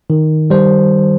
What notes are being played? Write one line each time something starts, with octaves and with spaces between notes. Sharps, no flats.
D#3
G3 C5